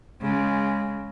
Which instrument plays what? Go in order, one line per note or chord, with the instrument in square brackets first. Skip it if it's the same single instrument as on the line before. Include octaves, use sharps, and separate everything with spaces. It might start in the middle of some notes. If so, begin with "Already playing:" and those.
[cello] C#3 G#3